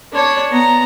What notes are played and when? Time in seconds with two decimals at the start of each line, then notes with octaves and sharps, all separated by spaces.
0.12 D4 C#5
0.51 B3 A#5